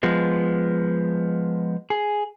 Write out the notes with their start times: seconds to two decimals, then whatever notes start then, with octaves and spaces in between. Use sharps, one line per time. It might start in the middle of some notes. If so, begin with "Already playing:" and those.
0.03 F3 G#3 B3
1.90 G#4